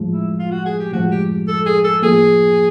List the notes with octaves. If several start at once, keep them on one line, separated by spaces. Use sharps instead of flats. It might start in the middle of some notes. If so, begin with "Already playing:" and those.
Already playing: A2 F3 G#3
E4
F4
F#4
G#4
G4
A2 F3 G#3 F#4
G4
A4
G#4
A4
A2 F3 A#3 G#4